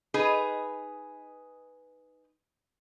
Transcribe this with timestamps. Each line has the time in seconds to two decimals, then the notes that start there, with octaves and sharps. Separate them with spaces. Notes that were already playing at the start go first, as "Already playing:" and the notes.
0.14 D#4 G#4 B4